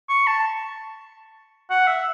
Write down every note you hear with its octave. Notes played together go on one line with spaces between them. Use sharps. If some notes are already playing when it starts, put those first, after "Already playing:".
C#6
A5
F#5
E5